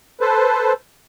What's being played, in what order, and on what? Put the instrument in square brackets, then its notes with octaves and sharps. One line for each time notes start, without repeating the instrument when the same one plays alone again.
[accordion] A4 B4 C5